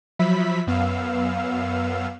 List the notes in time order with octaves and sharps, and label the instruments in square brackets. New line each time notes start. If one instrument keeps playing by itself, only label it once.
[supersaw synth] F3 F#3 E5 B5 B6
F#2 B3 F5 E6